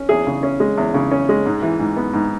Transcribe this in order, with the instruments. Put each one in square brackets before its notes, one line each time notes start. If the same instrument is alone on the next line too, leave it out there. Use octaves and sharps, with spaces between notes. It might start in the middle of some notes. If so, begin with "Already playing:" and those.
Already playing: [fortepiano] C#4
E2 G#4
C#3
C#4
G#3
E2
C#3
C#4
G#3
G#2
E3
G#2
B3
G#2